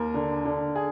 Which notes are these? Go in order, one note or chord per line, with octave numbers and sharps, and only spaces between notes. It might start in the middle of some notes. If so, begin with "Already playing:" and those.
Already playing: D#2 A#4
D3
D3
G#4